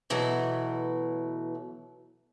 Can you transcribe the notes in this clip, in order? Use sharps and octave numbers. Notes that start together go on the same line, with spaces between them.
B2 E3 F#3 A3